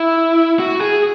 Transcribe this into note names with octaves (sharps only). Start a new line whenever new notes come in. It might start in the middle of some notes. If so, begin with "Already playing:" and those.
Already playing: E4
F#4
G#4